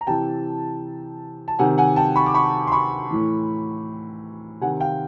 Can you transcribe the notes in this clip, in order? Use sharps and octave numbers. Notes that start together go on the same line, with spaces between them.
A#5
C3 E3 G5 A5
A5
C3 D#3 F#5 G#5
F#5 G#5
G5 A5
B5 C#6
D6
B5 C#6
C6
B5 C#6
A2 E3
C3 D#3 F#5 G#5
F5 G5